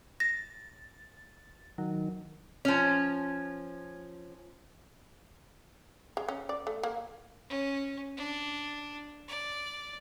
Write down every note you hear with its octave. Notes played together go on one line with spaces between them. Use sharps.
A6 A#6
D#3 F#3
F3 C#4
G#3
C#4
D5
A3
A#3
C#4
D4
D5